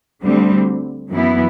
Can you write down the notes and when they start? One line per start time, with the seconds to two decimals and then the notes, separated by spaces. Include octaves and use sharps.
0.22 D2 D3 G3 C4
1.10 F#2 E3 B3 E4